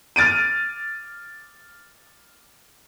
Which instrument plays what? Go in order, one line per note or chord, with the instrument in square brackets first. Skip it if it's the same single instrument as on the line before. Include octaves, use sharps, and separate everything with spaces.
[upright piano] F6 A6 D7 D#7